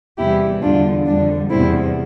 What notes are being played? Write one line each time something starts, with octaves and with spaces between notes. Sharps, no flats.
E2 C3 E3 G3 E4 G4
E2 D3 G3 D4 F4
F2 D3 G3 D4
E2 C3 G3 C4 E4